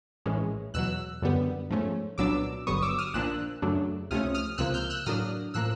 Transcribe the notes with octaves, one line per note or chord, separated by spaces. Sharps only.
A#1 A2 E3 G#3 C#4
E2 B2 F#3 E6 F#6
F#2 D3 G3 B3
G#2 F3 A3 C#4
C2 A#2 F#3 B3 D4 D6 E6
G1 G2 D3 F#3 B3 C#6 D#6
D6 E6
D#6 F6
A#1 A#2 F3 A#3 D4 E6 F#6
F#2 C#3 F#3 A3 D4
C#2 C3 F3 A3 C#4 D#6 F6
D#6 F6
C#2 C3 F3 A#3 E6 F#6
F6 G6
E6 F#6
A2 F#3 A#3 D4 D#6 F6
A2 F3 A#3 E6 F#6